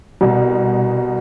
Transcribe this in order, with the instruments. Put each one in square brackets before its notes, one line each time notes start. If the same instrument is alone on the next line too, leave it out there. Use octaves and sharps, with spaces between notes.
[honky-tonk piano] C2 B2